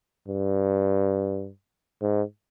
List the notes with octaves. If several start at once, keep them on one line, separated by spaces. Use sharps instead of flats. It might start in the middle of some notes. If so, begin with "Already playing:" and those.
G2
G#2